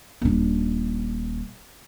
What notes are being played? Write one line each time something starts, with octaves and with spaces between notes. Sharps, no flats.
D#1 D4